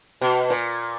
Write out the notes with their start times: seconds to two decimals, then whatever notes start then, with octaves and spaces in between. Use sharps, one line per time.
0.21 B2
0.50 A#2